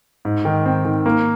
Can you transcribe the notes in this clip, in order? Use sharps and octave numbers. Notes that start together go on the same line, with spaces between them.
G#2
D#3
C4
D#3
A#3